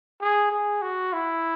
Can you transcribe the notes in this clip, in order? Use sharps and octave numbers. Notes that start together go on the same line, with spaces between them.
G#4
G#4
F#4
E4